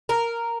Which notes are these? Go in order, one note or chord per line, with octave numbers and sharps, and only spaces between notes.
A#4